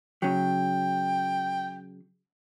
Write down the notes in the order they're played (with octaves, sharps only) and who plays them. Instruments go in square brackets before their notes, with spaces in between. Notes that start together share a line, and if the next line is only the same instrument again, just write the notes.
[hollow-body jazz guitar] C#3 F#3 [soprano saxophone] G5